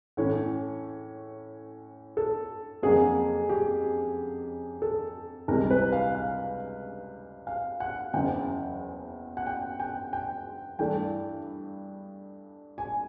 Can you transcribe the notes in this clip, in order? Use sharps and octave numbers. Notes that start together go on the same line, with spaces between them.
A2 E3 A3 C#4 E4 C#5
A4
F2 C#3 F#3 A#3 C#4 G#4
G4
A4
C#2 C3 E3 G3 A#4
B4
F5
F5
F5
F#5
F#1 E2 C#3 G5
F#5
G5
G5
G5
G2 E3 A3 D4 G5
G#5